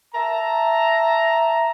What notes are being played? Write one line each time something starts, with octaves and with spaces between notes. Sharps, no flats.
E5 A5 A#5